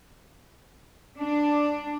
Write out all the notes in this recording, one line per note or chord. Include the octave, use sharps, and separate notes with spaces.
D4